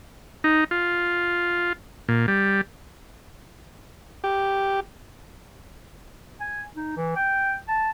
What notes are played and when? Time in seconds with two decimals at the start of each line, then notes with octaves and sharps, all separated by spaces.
0.44 D#4
0.71 F4
2.09 A#2
2.28 G3
4.24 G4
6.40 G#5
6.76 D#4
6.97 E3
7.16 G5
7.68 A5